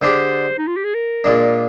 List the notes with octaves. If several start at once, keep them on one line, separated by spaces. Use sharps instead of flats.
D3 G#3 D4 G4 C5
D#4
F4
G4
G#4
A#4
A#2 G#3 D4